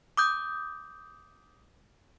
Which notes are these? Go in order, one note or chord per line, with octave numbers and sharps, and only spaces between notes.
D6 D#6 G6